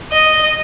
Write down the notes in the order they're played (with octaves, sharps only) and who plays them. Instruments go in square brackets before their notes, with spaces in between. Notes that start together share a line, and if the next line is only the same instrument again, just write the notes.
[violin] D#5